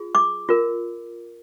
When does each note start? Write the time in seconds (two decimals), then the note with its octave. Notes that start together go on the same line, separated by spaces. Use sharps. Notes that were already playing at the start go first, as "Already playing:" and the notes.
Already playing: F4 G#4
0.15 D6
0.49 F4 A#4